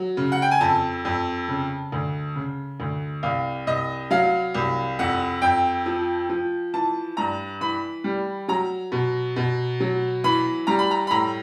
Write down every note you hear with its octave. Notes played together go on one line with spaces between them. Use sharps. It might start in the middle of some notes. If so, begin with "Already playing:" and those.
Already playing: F#3
C#3
F#5
G5
G#5
F2 A5
F2
C#3
D2
C#3
D2
C2 F5
C2 D#5
F#3 F5
C2
F2 F#5
F2 G5
F3
F3
E3 A5
G2 A#5
E3 B5
G3
F#3 A#5
B2
B2
F#3
E3 B5
G3 A#5
B5
A#5
B5
A2 A#5